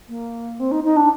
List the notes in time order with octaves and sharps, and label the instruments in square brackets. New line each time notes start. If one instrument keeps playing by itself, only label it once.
[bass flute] A#3
C4
D#4
D#4
D4